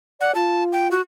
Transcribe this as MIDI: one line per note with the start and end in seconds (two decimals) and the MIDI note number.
0.21 0.32 74
0.21 0.32 78
0.35 0.94 65
0.35 0.64 81
0.73 0.88 79
0.91 1.01 66